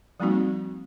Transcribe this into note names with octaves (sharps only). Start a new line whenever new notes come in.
F3 G3 A#3 C4 D#4 F#4